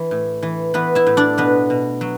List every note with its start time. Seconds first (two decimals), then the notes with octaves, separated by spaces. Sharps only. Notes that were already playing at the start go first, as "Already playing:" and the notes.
Already playing: E3
0.11 A2
0.43 E3
0.74 E3 B3 B4
0.95 E4 E5
1.07 A2
1.17 D4 D5
1.37 B2 B3 B4
1.70 B2
2.01 F#3